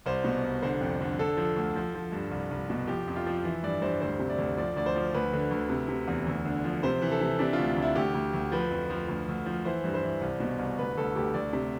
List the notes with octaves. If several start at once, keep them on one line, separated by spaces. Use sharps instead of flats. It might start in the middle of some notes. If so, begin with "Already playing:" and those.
C2 C5
B2
C2
D3 C5
F2
D3
D3 A4
F3
D2
F3
F3
G2
C2
C2
B2
F3 G4
F2
F4
F3
E3
G2 D5
G2 C5
D2 C5
C3
D5
D2
F3 D5
D2 D5
C5
F3
D2 B4
D3
D2
C3
C3
E2
D2
D3
F3
C3 C5
E3
A4
C3
C3 D4
F4
D2
D2
E4
D2 G4
D2
D2
F3 B4
F2
F3
D2
D2
F3
E3 C5
G2
C5
E3
C2
B2
C2
D2 B4
D2 A4
D2 G4
D2 D5
C3